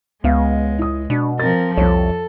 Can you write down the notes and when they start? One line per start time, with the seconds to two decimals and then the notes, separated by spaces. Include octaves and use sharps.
0.24 C#2 G#3 B3 F5
0.79 E4 D#6
1.10 B2 D4
1.40 F3 C4 A#4 A6
1.77 C2 F2 A4 C#5